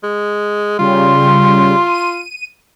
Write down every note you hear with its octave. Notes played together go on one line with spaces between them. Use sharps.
G#3
C#3 G3 F4 C6
D#7